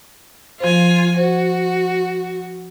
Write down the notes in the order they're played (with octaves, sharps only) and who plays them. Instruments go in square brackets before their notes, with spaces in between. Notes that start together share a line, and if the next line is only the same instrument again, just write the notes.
[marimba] F3 C5 [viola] F4 G#5
[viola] F#4 [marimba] C5